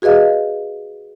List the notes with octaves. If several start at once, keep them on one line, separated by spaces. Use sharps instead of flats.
F#4 G#4 B4 D#5 F5